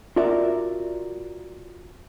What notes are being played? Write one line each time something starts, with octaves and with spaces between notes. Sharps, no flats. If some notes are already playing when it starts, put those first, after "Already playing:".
F4 F#4 A#4 D5 E5